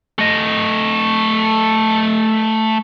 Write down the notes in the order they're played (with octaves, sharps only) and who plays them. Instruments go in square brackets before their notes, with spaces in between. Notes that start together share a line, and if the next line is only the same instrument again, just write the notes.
[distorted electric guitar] A3 D#5